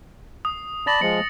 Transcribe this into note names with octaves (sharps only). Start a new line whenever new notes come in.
D#6
D5 A5 B5 A6 A#6 F#7
F3 G#3 C#7